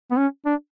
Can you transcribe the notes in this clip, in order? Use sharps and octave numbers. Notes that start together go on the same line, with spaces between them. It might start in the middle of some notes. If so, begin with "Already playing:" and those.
B3
C#4
D4